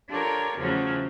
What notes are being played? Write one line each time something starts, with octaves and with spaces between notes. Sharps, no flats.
D4 F4 G4 A4 A#4 C#5
E2 C#3 F3 F#3 A3 C#4